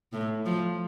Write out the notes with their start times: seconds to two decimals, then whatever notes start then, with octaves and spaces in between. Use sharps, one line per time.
0.13 A2
0.46 F3